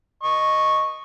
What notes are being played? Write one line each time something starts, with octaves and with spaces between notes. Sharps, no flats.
D#5 C#6